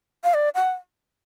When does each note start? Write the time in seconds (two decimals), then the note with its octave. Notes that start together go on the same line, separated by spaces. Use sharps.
0.24 F5
0.34 D5
0.55 F#5